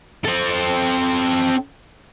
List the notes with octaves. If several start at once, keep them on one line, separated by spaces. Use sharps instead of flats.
C4 A4